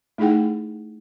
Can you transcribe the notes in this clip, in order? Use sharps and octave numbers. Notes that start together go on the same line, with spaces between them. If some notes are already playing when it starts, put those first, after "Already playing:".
A3 D#4 E4 G#4 F#5 G5